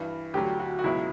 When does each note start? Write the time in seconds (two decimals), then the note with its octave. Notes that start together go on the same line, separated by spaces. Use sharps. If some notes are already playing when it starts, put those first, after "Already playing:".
Already playing: G2 E3
0.34 D2 D3 F#3 G4
0.59 F#4
0.79 F#4
0.84 C#2 B2 F#3 E4